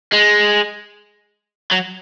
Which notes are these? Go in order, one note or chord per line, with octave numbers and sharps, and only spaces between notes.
G#3
F#3